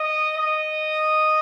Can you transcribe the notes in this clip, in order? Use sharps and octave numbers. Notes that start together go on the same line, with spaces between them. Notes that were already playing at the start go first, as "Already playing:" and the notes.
Already playing: D#5
D#5